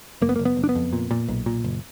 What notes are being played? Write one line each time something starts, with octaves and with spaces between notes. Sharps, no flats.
F#1 A#3
B3
F#1 A#3
B3
F#1
D4
B3
F2
A#2
A#2
B1
A#2
F#1